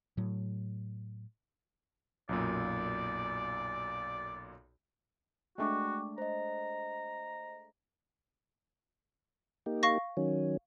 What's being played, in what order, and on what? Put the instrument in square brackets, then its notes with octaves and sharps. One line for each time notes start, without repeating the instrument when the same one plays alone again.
[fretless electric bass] A2 F#3
[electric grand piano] B1 F#2 A#2 [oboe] D5
[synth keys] G#3 A3 D4 [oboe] F#4 [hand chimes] G5 C#6 D6
[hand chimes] C5 D#5 [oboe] A#5
[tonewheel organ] A#3 D#4 G4
[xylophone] F5 C#6 A#6
[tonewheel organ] D#3 F#3 C#4